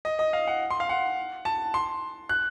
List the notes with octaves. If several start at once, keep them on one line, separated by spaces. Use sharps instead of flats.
D#5
D#5
F5
F#5
C6
F5
F#5
A5
C6
F#6